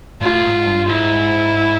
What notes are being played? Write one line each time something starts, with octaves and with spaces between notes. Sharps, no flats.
A2 F4
G#2
G2
G#2 E4